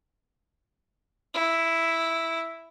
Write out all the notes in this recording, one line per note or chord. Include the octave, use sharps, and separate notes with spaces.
E4